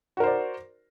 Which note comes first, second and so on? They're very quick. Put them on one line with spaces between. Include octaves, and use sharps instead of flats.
F#4 A#4 C5 D5